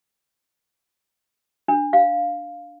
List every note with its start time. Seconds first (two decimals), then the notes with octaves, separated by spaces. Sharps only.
1.68 D4
1.93 F5